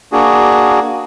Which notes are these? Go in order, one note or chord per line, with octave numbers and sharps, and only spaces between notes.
A#3 D4 F#4 G#4